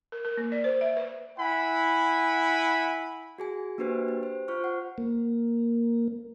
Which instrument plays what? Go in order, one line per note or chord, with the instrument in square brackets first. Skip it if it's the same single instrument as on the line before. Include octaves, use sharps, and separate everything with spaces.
[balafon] A#4
A#4
A#3
D5
C5
E5
B4
[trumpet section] E4 F#5 G#5 B5
[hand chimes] F#4 G#4 G#5
A#3 D4 F#4 G4 B4 C5
G4
C5
F4 C5 C#6 F6
F#5
[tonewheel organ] A#3